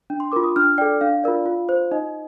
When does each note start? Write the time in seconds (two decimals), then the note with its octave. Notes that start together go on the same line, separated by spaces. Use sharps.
0.10 D4
0.20 C6
0.32 F4 A#4 D6
0.44 D#6
0.56 D4 F6
0.78 A4 D5 G5
1.01 D4 F5
1.24 F4 A#4 D5
1.46 F4
1.69 C5
1.91 D#4 D#5